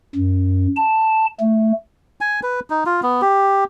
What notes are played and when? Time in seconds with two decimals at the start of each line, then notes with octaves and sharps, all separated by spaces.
0.15 F#2
0.76 A5
1.40 A3
2.21 G#5
2.43 B4
2.70 D#4
2.86 F4
3.03 B3
3.22 G4